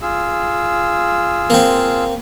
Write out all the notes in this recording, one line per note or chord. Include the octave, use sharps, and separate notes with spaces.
F4 G#4 E6
A#3 C4